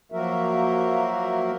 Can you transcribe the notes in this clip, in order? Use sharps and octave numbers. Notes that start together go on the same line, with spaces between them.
F3 F#3 A#3 F#4 A#4 E5